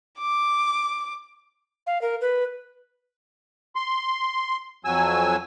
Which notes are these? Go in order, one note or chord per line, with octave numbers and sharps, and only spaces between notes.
D6
F5
A#4
B4
C6
F2 F#3 G#5 E6